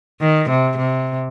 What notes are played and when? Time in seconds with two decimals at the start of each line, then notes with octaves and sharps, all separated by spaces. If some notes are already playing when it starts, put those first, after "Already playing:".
0.21 D#3
0.49 C3
0.77 C3